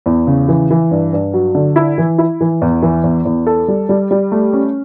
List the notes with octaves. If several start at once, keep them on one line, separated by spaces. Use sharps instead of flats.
E2
C#3
E3
E3
G2
G2
F#3
D3
E4
E3
E4
E3
E2
E3
E2
E2
A4
G3
G3
G3
A3
C#4